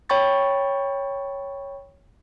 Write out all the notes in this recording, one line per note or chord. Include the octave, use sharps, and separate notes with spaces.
C#5 G5 B5 C#6 A6